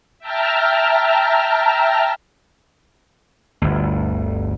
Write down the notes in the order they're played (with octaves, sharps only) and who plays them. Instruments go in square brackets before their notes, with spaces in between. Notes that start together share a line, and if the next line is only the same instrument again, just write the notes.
[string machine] E5 G5 A5 A#5 F6
[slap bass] G1 D2